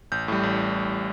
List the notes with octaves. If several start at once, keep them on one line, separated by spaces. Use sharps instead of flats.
A1 G6
A2 G3
A1